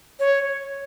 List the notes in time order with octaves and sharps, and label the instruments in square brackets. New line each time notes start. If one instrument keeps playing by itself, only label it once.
[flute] C#5